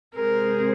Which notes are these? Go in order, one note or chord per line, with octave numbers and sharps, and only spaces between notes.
C3 G#3 C4 G#4 A#4 C5